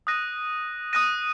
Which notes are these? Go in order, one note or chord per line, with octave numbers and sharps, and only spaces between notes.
D#6 F#6 A#6 D#7
D#6 F#6 A#6 D#7